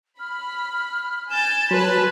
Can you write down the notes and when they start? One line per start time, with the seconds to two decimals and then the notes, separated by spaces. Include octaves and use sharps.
0.20 B5 F6
1.30 G#5 G6 A6 E7
1.71 F#3 B4 G#5 A5 B5 C6